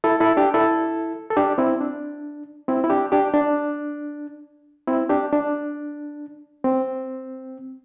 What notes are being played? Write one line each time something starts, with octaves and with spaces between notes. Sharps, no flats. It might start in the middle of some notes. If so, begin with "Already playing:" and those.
E4 A4
E4 A4
D4 G4
E4 A4
A4
D4 G4
C4 E4
D4
C4 E4
E4
D4 G4
D4 G4
D4
C4 E4
D4 G4
D4
C4